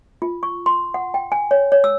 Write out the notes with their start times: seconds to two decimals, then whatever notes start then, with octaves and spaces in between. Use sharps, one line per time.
0.22 F4
0.43 C#6
0.66 C6
0.94 F#5
1.14 G5
1.32 G#5
1.51 C#5
1.72 C#5
1.84 E6